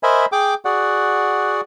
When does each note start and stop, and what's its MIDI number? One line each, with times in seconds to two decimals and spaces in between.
0.03 0.26 70
0.03 0.26 72
0.03 0.26 75
0.03 0.26 76
0.03 0.26 80
0.03 0.26 83
0.32 0.54 68
0.32 0.54 79
0.32 0.54 86
0.65 1.61 66
0.65 1.61 68
0.65 1.61 74
0.65 1.61 78